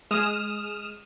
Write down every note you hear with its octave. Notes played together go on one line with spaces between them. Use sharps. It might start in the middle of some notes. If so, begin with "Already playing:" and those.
G#3 D#6 F6 E7